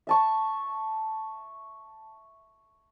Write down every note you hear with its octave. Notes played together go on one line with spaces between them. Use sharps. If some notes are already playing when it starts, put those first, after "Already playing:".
E5 A5 C#6